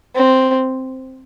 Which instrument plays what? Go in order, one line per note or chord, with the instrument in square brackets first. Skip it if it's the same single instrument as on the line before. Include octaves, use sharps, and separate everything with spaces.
[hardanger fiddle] C4